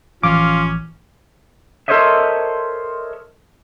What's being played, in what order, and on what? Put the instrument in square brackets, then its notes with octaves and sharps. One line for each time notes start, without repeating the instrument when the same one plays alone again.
[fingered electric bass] A1 E3 F3 [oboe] C#4 [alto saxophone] F4 [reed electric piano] D6
[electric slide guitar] A4 A#4 C5 C#5 D#5 E5